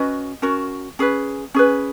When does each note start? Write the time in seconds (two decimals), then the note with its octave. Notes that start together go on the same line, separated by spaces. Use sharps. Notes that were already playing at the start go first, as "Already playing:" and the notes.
Already playing: C#4 F#4 B4 D#5
0.42 C#4 F#4 A#4
0.99 C#4 G#4 B4
1.54 C#4 G#4 B4